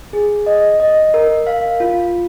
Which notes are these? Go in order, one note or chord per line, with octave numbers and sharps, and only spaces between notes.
G#4
D#5
D#5
A#4
F5
F4